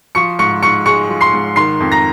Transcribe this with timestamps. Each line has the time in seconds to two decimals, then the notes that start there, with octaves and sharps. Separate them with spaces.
0.15 F3 C#6 C#7
0.39 G#2 C#6 C#7
0.62 G#2 C#6 C#7
0.86 G#3 C#6 C#7
1.09 F3
1.21 C6 C7
1.33 G#2
1.56 D#3 C6 C7
1.80 F2
1.92 A#5 A#6